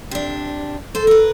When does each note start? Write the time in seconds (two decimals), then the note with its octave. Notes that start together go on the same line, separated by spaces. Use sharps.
0.11 C3 D4
0.95 A4 C5
1.07 A#4 B4